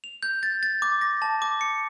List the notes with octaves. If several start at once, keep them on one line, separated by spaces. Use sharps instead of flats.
F7
G6
A6
A6
D6
A#6
A5
D6
C#7